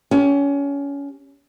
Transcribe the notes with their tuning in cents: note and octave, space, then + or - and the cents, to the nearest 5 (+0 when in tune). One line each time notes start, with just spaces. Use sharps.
C#4 +25 G4 +5